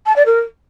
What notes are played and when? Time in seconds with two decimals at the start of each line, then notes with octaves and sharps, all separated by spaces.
0.06 A5
0.16 D5
0.26 A#4